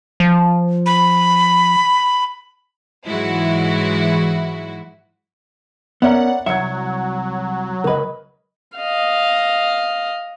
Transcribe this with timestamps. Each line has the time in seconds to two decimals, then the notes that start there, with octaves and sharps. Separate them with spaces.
0.20 F3
0.86 B5
3.06 G#2 E3 F#3 G#3 E4 F#4
6.02 B3 C#4 A#4 C#5 D5 E5 F#5
6.46 C2 A#2 F#3 E5 G#6 C#7
7.84 C#2 A#4 B4 D#5
8.76 D#5 F5